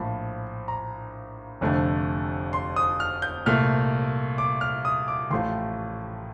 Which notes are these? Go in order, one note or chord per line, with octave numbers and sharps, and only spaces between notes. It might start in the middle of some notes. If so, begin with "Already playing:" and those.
Already playing: A#1 A2 F3 A5
A#5
F1 F2 D3 A3
C6
D#6
F6
G6
C2 A#2 A3 F6
D6
F6
D#6
D6
A1 A2 F3 A3 C6